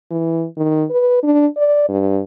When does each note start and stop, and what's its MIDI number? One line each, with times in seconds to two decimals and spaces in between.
0.11 0.45 52
0.57 0.84 51
0.90 1.18 71
1.23 1.47 62
1.57 1.85 74
1.89 2.21 43